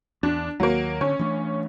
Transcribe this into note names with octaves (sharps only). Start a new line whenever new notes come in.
E2 D4
D#2 F#3 A#3
D3 C#4
E3 A3 D4